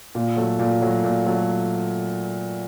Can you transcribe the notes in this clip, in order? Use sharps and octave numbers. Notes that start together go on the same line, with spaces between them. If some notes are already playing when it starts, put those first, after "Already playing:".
A#2
F#3 A3
A#2
F#3 A3
A#2
F#3 A3